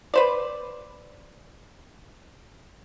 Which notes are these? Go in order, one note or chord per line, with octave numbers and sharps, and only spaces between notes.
B4 C5 D5